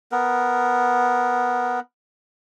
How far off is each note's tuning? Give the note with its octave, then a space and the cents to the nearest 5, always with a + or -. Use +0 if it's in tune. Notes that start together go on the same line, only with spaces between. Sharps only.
B3 +0 A#4 +0